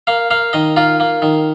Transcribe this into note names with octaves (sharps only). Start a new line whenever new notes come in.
A#3 F5
A#3 F5
D#3 D#5
A#3 F4
A#3
D#3